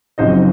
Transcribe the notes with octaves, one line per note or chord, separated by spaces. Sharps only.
F#1 F#2 F3 C4 D#4 C5 D#5